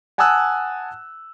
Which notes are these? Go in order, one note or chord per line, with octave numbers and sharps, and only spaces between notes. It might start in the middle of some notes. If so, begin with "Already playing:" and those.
F#5 G#5 A5 D#6 E6 F#6